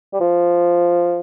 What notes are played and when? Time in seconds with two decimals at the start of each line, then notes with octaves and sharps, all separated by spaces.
0.13 G3
0.20 F3